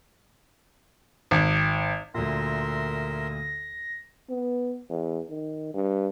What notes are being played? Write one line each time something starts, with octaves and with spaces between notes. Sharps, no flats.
G#1
D2 A#2 A#4 E5 C6 A#6
B3
E2
D#3
G2